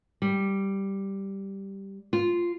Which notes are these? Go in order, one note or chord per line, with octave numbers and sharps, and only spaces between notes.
G3
F4